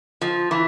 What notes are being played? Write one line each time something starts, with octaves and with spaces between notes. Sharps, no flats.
F3
E3